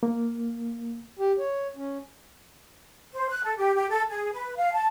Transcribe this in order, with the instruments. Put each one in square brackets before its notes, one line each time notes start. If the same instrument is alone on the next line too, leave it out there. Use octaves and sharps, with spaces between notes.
[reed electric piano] A#3
[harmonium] G4
C#5
C#4
[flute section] C5
F#6
A4
G4
G4
A4
G#4
B4
F5
A5